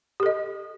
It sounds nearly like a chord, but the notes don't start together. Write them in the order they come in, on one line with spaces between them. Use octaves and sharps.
G4 A4 D#5